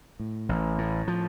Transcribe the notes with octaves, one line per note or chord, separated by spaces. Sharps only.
A2
A1
A2
F3